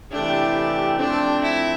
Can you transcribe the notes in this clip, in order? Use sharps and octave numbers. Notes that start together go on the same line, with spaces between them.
C3 E3 A3 D4 E4 G4
F3 A3 C4 D4
E4